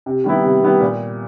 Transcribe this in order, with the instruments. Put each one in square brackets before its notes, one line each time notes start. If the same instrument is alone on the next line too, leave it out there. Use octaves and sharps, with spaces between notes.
[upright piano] C3
D#3 G3 B3 E4
C3
D#3 G3 B3 E4
A#2